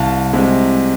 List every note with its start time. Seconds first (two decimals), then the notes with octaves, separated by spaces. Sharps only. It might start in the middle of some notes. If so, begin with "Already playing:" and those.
Already playing: C2 F5 A5
0.33 C3 G#3